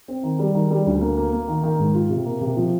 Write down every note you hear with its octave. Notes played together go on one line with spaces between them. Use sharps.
C4
D#3
G3
D#3
G3
D2
A#3
A#3
A#3
D#3
D#3
G#2
F4
C3
A#3
C3
F3